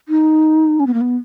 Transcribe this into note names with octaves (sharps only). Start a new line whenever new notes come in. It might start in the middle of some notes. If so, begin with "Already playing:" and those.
D#4
C#4
B3
A#3
B3